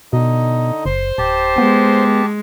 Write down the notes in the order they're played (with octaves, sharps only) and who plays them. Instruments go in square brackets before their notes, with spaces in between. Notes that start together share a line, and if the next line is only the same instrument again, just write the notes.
[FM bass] B2 [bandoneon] D3 D#4 D#5
[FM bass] F#1 [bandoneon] C5 C6
[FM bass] D1 [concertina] G4 A5
[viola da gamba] G#3 [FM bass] B3